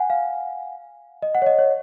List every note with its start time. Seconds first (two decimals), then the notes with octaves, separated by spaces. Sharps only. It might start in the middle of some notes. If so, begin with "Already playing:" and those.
Already playing: F#5 G#5
0.10 F5
1.22 D#5
1.35 F#5
1.42 C#5
1.47 D#5
1.59 C#5